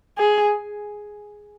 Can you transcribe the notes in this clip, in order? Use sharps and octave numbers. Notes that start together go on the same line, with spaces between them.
G#4